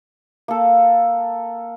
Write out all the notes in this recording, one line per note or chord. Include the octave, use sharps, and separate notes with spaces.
A#3 A4